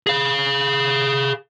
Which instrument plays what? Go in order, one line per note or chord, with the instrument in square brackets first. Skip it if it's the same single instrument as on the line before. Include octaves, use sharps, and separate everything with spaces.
[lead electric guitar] G#4 F5